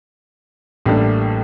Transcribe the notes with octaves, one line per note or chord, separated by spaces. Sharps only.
A1 A2 G3 A#3 D4